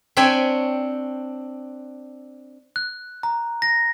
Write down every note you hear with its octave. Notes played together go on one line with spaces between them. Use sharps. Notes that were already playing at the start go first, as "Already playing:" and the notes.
C4 D4 C#5 G5 G#5 B5
F#6
A#5
A#6